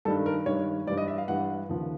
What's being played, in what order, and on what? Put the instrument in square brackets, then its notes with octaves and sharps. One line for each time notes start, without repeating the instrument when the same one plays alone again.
[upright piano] G2 D#3 G3 A4
A#4
G2 D#3 G3 C#5
G2 E3 G3 D5
D#5
E5
F5
G2 E3 G3 F#5
D#2 C#3 F3